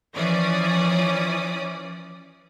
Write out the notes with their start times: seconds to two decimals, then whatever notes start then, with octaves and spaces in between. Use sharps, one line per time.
0.15 E3 F3 C#4 D5 D#6